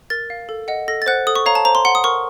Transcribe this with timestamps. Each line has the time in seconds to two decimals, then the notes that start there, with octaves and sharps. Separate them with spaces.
0.10 A#4 A6
0.30 F5
0.49 A4
0.68 D#5 F#5
0.88 A4 A#6
1.02 A6
1.06 C5 F#5 F#6
1.27 A4 D#6
1.36 C#6
1.46 C#5 F5 A#5
1.55 A5
1.65 C5 A#5
1.75 C6
1.85 F#5 C6
1.95 D#6
2.04 A#4 C#6